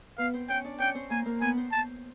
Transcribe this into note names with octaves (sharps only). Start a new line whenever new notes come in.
B3 B4 F5
C4 C5
C#4 C#5 G5
D4 D5
C#4 C#5 G5
C4 C5
A#3 A#4 G#5
A#3 A#4
B3 B4 G#5
C4 C5
A5